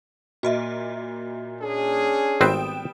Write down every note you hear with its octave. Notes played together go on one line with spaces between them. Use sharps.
A#2 F#4 D#5 E5
C#4 D4 G#4
G#1 G3 B3 C4 B4 G5 D#6 E7